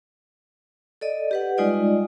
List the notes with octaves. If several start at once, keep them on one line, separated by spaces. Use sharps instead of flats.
A4 D5 D#5
G4 B4 F#5
G3 G#3 D#4 F4 D5 D#5